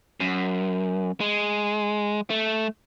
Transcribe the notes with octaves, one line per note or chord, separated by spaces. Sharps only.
F#2
G#3
A3